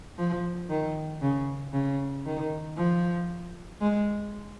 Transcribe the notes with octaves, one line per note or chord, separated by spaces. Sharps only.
F3
D#3
C#3
C#3
D#3
F3
G#3